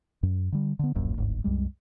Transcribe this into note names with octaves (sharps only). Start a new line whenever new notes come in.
F#2
D3 G3
D3 B3
D1 A#1 F#2 A#2
D1 G1 G#2
C2 F#2 G3 G#3